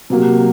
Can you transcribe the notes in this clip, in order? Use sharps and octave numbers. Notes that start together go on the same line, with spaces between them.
C3 F#3 A#3